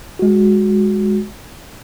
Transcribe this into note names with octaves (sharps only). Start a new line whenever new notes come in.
G#3 F#4